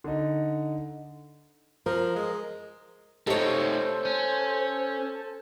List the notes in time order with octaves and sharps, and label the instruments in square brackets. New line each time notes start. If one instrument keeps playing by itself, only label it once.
[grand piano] D3 D#4
[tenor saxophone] F3 [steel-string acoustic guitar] A#4
[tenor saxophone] G#3
[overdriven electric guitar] A3 D#4 [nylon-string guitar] G4 C#5 [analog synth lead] A4 [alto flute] C5
[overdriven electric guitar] C#4